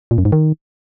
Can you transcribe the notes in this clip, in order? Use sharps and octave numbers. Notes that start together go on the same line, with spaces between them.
A#2
F#2
G#2
D#3